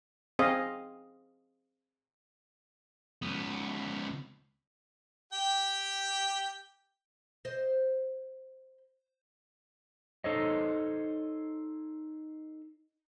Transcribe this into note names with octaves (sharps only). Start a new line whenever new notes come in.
C4 G#4 D#5 F5
C#2 B3
G4 G5
C5 D#5
D#4 A4 C5 C#5 D#5